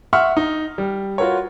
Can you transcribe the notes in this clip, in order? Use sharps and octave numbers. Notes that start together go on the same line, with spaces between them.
E5 F#5 C6 C#6 F6
D#4
G3
F4 F#4 A#4 B4 C#5